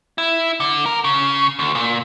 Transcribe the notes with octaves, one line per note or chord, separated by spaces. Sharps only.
E4
D3
A#4
C#3
D2
A#2